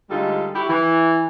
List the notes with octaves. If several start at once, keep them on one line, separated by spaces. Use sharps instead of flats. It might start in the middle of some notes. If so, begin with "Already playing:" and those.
D2 G3 G#3 D#4 F4 A4
E4 F#4 G4
E3